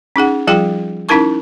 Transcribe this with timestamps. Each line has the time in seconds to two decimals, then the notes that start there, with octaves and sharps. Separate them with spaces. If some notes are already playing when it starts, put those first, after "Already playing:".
0.16 C#4 D#4 G#4 F#5
0.47 F3 G3 F4 G#4 G5
1.09 C#4 D#4 E4 A#4 A5 C#6